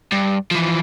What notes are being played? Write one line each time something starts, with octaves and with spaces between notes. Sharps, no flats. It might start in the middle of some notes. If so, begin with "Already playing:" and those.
G2
E3 F3